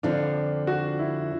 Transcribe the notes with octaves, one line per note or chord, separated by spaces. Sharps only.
F2 D3 F3 D4
F#4
E4